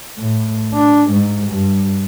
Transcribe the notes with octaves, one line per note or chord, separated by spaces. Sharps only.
A2
D4
G#2
G2